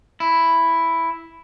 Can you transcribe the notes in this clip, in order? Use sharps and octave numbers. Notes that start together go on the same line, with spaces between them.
E4